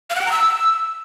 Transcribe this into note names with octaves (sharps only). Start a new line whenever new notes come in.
F5
F#5
G5
A#5
E6